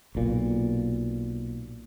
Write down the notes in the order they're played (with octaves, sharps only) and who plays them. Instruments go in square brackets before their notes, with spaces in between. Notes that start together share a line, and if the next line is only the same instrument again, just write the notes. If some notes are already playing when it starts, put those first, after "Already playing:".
[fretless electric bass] B1 A#2